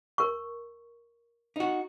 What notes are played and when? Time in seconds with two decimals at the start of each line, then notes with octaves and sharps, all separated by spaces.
0.18 A#4 C#6
1.56 D#4 F#4